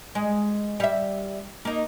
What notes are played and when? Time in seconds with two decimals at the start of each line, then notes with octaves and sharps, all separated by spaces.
0.15 G#3
0.80 G3 E5
1.65 A#3 D#4